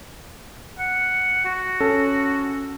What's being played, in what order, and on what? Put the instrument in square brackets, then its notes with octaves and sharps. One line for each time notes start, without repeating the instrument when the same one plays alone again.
[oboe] F#5
F#4
[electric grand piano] C#4 A4